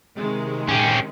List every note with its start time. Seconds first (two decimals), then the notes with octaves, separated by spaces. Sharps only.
0.18 C3 D#3 G#3
0.68 C#4 G4